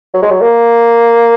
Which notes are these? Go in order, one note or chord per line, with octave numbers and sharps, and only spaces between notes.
F#3
G#3
F#3
A#3